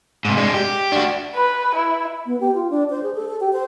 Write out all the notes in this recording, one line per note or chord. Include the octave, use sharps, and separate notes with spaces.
G#2 C3
G#3 D4
G4
D4 F#4
B4
E4
B3
G4
F4
D4
C5
G#4
A4
A4
G4
C5